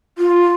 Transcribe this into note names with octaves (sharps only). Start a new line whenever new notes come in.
F4